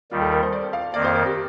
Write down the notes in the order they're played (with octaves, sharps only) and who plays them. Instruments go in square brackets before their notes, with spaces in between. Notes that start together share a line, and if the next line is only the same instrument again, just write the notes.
[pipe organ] D#2 D#3 G3 [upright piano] F4
[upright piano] A4
A#4
C5
D5
F5
[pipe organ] F2 D#3 A#3 [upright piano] D5
[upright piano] C5
A#4
G4